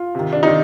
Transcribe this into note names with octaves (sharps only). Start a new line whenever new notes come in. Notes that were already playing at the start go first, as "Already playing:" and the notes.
Already playing: F4
C3 D#3
D4
C3 D#3 D#4